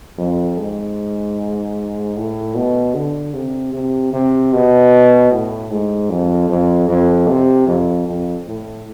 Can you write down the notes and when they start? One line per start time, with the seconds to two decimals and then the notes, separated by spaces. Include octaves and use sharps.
0.18 F2
0.58 G#2
2.16 A2
2.55 B2
2.95 D3
3.34 C3
3.74 C3
4.13 C3
4.53 B2
5.32 A2
5.71 G#2
6.10 F2
6.50 F2
6.89 F2
7.29 C3
7.68 F2
8.07 F2
8.47 A2